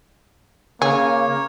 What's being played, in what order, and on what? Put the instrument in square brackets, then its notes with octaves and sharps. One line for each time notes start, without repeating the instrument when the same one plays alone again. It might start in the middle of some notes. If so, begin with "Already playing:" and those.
[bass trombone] C#3 [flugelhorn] A#3 [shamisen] G#4 [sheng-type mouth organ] C#5